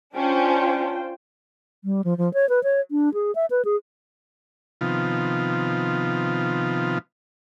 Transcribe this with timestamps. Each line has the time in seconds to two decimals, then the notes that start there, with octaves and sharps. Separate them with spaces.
0.15 C#4 D4 F4 C5 G5
1.84 G3
2.04 F3
2.18 F3
2.34 C#5
2.49 B4
2.63 C#5
2.91 D4
3.14 G#4
3.35 E5
3.51 B4
3.65 G#4
4.81 C3 D#3 F3 B3 F4